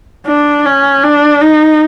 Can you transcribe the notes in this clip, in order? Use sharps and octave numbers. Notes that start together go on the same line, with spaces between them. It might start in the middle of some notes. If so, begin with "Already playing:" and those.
D4
C#4
D4
D#4